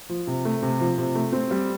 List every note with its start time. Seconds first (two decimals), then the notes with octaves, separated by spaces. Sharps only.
0.09 F3
0.27 C3
0.45 A3
0.62 C3
0.80 F3
0.98 C3
1.15 A3
1.33 C4
1.51 G3